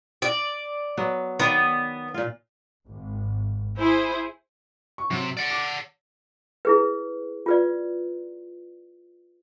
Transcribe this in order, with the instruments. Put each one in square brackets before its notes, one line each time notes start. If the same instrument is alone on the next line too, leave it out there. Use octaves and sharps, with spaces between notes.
[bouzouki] D5
[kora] F#3 B3
[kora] D#3 D5 [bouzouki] B3
[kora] A#2 F4
[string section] G#1
E4 G#4 C5
[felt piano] C#6
[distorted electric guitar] C3 [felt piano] F#3
[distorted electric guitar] D5 F#5
[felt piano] D6
[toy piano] E4 G#4 B4
F4 B4 D5